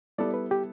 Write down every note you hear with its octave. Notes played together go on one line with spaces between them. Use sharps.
G3 B3 E4 A4 D5
B4
G4